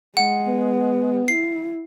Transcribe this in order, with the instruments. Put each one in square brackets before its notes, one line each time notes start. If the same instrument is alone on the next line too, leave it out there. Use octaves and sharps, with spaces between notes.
[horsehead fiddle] G#3 [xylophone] F#5
[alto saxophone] B3
[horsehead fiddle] E4 [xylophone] C7